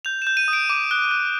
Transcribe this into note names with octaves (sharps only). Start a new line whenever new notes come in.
G6 F7
G6 E7
D#7
D#6
D7
D6
F#6
F#6